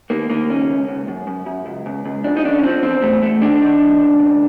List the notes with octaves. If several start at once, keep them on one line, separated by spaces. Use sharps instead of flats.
D#3 A#3
D#3 A#3
C#2 C#4
C#2
C#2
F#2
F#2
F#2
C#2
C#2
C#2
F2 D4
D#4
C#3 D4
C#4
F3 C4
E2 C4
E2 A3
E2 A3
D#3 D4
D#3
C2
C#2
C#2